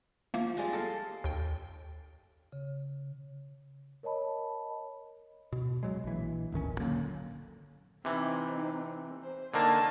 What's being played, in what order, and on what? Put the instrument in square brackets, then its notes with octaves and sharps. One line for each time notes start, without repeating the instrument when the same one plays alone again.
[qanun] F3 [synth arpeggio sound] A3 A#3
[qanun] G3 G#3 D5
A4 F5
[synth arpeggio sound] D#2 G5
[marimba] C#3
[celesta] A#4 C#5 D#5 A5 B5
[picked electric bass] B2
B2 F#3 G#3
A#1 E3
D1 G1 D#3 C#4
A#2 D3 F#3 A#3
[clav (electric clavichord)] C3 E3 [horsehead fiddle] C4 D#4
[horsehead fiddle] C5
[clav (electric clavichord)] D3 D#3 A#3 [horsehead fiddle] G#5 [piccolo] A5